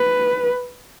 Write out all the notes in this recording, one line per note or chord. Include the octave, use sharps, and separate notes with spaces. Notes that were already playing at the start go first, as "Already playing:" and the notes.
Already playing: B4